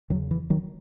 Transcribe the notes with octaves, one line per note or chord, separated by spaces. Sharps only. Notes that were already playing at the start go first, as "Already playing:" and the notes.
E2 C#3 D#3 F#3
E3
D#3 F#3